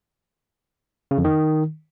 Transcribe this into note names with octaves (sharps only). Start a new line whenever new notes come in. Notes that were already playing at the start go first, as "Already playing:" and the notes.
C#3
F2
D#3